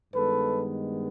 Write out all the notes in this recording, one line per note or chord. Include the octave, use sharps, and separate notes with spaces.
G2 D#3 G#3 B3 A4 B4